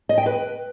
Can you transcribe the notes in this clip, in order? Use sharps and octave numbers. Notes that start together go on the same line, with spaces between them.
D#5
G5
B4